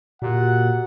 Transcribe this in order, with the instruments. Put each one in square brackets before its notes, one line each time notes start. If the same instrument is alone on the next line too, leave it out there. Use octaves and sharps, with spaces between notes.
[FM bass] A#2 [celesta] F#4 G4 [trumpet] F#5